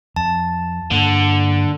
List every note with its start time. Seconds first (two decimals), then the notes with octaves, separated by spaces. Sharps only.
0.16 F2 A5
0.91 G2 D3 A#3